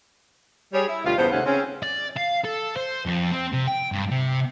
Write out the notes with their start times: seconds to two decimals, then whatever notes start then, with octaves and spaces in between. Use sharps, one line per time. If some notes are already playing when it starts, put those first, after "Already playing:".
0.74 G3 G#4 C#5
0.88 E4
1.05 D2 B2 G3 F4
1.17 E2 G2 C#3 B3 C5
1.32 D#2 G#2 C3 A3 C#4 F#5
1.46 C#3 C4 C#4
1.83 D5
2.17 F5
2.45 A4
2.77 C5
3.06 F2
3.32 C4
3.53 C3
3.67 G5
3.92 G2
4.11 C3